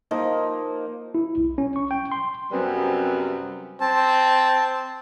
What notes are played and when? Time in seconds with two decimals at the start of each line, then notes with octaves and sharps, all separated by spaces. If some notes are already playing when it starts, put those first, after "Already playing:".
0.11 F3 A#3 D#4
1.15 E4
1.37 B1
1.58 C#4
1.76 C#6
1.91 G5
2.12 C6
2.52 F#2 C3 G3 B3 C4 B4
3.81 C4 A5